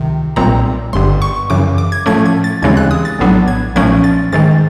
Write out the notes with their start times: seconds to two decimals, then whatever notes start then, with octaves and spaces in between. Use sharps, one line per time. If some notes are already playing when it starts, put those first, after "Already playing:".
Already playing: C#2 C3 D#3
0.36 B1 A#2 G3 C4 A#5
0.93 G1 G2 D3 C6
1.22 C#6
1.50 F#2 C#3 E3 D6
1.78 D6
1.92 G#6
2.06 A2 F3 A3 C#4 G#6
2.26 G#6
2.44 A6
2.62 D#2 C#3 E3 G#3 C4 G#6
2.77 F#6
2.91 D#6
3.05 A6
3.19 A#1 A2 F#3 B3 D4
3.48 G#6
3.76 B1 A#2 F3 A3 C#4 G#6
4.04 A6
4.33 G#2 D#3 G#3 A6